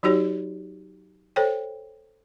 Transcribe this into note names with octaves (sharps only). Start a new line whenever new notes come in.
F#3 D#4 F#4 G4 C#5
A4 C5 C#5 G5